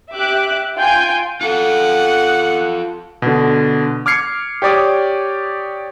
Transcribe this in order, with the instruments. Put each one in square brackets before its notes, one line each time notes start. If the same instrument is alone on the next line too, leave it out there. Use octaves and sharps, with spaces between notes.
[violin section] G4 E5 D6 F#6
F4 G5 G#5 G6
[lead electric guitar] F4 A4 [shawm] F#5
[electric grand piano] B2 D3
D6 F6 G#6 C7 C#7
G4 C#5 D5 D6 D#6